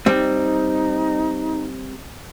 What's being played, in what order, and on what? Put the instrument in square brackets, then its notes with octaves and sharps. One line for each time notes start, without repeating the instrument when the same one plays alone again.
[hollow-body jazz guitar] G3 C4 [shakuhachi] D#4